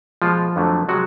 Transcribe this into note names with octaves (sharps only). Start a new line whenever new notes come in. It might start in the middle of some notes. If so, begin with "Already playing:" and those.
B2 F3 G#3 F4
F2 D3 F#3 A3
C3 F3 F#3 G#3 F#4